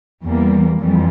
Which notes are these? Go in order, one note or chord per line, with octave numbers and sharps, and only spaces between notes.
E2 E3 G3 A#3
F2 E3 G3